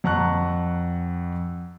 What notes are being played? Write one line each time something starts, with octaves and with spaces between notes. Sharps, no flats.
F2 F#5 A5 A#5 C#6 F#6